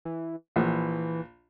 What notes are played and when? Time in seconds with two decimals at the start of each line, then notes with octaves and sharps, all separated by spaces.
0.05 E3
0.56 A#1 E3